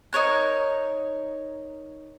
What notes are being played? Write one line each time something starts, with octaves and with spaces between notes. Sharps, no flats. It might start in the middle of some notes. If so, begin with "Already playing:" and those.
D#4 A#4 C#5 F#6